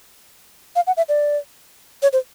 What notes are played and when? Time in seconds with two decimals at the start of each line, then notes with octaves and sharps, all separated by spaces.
0.76 F5
0.87 F#5
0.97 E5
1.09 D5
2.03 C#5
2.13 C5